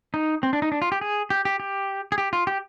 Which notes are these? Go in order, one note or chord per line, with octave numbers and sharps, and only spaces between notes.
D#4
C4
D4
D#4
D4
F4
G4
G#4
G4
G4
G4
G#4
G4
F4
G4